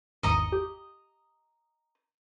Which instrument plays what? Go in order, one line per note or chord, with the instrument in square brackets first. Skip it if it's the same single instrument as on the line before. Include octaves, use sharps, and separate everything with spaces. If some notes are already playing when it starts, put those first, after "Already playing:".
[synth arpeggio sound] G#1 E2 C#7 [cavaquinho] D#5 A#5 D#6
[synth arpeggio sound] G4